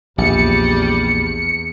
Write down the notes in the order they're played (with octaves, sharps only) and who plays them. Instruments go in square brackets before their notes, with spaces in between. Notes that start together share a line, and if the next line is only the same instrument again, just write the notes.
[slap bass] A#1 [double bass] E2 [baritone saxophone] G3 [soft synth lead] C#7